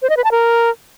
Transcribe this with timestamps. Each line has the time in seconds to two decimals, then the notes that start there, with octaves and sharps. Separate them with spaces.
0.02 C5
0.10 D#5
0.17 B4
0.24 A5
0.31 A#4